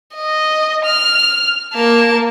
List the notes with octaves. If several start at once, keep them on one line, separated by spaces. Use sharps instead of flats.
D#5
F6
A#3 A5